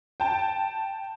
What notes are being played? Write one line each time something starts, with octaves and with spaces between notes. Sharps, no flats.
G5 A5